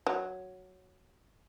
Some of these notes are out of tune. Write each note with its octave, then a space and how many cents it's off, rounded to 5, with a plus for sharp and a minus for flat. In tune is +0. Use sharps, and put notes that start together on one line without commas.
F#3 +0